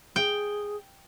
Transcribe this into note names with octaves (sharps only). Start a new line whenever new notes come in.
G#4 G5